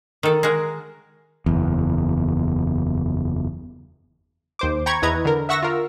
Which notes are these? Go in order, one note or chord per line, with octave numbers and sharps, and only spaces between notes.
D#3 A4
G#3 F#4 A#4
F#1 E2
D#2 C5 D6
G5 A#5 B5 C#6 G#6
E2 E4 B4 D#5 A#5 G#6
D3 A#4
E5 F#5 C#6 E6 A#6
F4 A#4